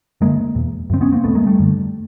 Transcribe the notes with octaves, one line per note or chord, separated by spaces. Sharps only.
F#2 D3 G#3 A#3
E2 B2
F#2 C#3 C4
B3 C#4
A#3 C4
E2 B2 A3 B3
G#3 A#3
G3 A3
F#2 D3